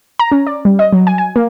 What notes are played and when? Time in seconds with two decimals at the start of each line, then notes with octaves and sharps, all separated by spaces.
0.19 A#5
0.32 C#4
0.46 D5
0.65 G3
0.79 D#5
0.93 F#3
1.07 G#5
1.18 G#5
1.36 A#3